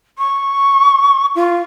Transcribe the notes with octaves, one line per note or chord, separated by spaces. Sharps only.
C#6
F4